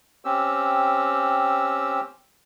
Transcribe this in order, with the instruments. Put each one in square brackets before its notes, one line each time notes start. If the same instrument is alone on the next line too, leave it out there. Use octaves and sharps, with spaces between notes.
[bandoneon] C4 C#4 G4 E6